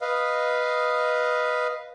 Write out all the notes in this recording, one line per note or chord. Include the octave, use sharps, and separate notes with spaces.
B4 D#5 F5